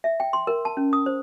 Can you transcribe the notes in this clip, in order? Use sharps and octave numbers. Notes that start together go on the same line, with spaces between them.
E5
G5
C6
A#4
A5
C#4
D#6
C5